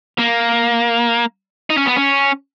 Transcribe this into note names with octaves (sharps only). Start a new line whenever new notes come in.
A#3
D#4
C#4
B3
C#4